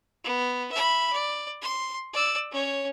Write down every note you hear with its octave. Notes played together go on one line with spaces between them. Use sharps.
B3
E5 B5
D5
C6
D5 E6
C#4 C#5